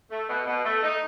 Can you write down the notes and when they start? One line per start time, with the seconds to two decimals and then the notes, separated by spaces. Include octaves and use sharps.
0.11 A3
0.29 B2
0.47 B2
0.64 A3
0.82 D#4